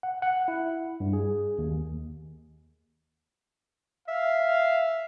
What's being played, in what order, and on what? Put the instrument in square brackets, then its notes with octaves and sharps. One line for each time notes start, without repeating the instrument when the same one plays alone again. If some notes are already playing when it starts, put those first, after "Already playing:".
[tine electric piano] F#5
F#5
E4
G2
G#4
D#2
[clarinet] E5 [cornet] F5